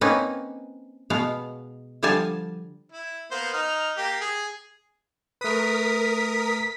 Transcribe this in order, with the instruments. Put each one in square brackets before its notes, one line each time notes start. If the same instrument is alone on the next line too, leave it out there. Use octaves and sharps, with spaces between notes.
[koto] A#3 C4 C#4 D#4 B4
B2 G#3 B3 F5
D3 F3 G3 F5 G#5 A5
[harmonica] E4
A#3 B3 C5
D#4 F6
A#3 G4
G#4
[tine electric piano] A3 B4 [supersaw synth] A#4 D#6 [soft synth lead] B6